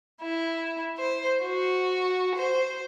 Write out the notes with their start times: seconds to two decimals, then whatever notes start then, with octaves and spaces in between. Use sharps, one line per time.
0.21 E4
0.97 C5
1.43 F#4
2.35 C5